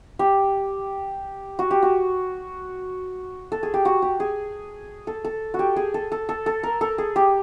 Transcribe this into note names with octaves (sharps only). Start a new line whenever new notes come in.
G4
F#4
G4
F#4
A4
G#4
G4
F#4
G4
G#4
A4
A4
F#4
G4
G#4
A4
A4
A4
A4
A#4
A4
G#4
G4